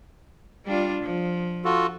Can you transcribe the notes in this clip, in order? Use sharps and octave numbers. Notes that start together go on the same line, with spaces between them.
G3 D4 F4
F3
F4 F#4 A4